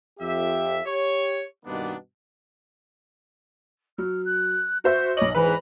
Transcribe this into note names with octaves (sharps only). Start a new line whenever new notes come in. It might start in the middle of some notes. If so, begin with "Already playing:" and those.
F2 G4 E5
G4 C#5
G2 B2 D#3 A#3 B3 D4
F#3 F6
F#6
F#4 C5 E5 G6
B1 C#5 D#5 D6 F#7
E2 G#2 E3 B4 A#5